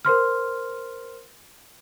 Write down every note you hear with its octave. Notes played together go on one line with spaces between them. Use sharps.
A#4 C5 C6 F6